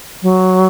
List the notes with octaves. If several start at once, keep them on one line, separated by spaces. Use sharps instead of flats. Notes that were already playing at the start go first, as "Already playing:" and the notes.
F#3